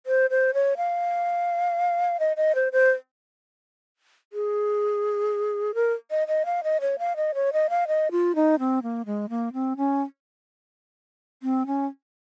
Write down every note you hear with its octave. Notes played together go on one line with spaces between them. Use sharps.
C5
C5
C#5
F5
D#5
D#5
C5
C5
G#4
A#4
D#5
D#5
F5
D#5
C#5
F5
D#5
C#5
D#5
F5
D#5
F4
D#4
C4
A#3
G#3
A#3
C4
C#4
C4
C#4